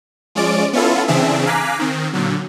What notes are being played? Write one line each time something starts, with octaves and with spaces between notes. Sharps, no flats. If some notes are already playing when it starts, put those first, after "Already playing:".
F3 G#3 C#4 D5 D7
B3 C#4 E4 F4 A4
C#3 E3 C4 D4 G#4 E5
F5 G#5 A#5 D6 F#6 B6
D#3 C4
A#2 D3 F#3